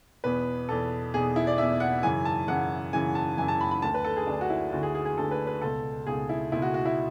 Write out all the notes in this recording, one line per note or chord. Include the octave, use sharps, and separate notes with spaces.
E2 B2 B4
E2 B2 A4
E2 B2 G#4
E4
D5
E2 B2 E5
F#5
F#2 C#3 E3 G#5
A5
F#2 C#3 E3 F#5
F#2 C#3 E3 G#5
A5
F#2 C#3 E3 G#5
A5
B5
B5
D2 D3 A5
B4
A4
G#4
D2 D3 D4
F#4
E4
D2 D3 F#4
G#4
G#4
G#4
D2 D3 A4
B4
B4
C#2 B2 A4
C#2 B2 G#4
E4
C#2 B2 E4
F#4
F#4
E4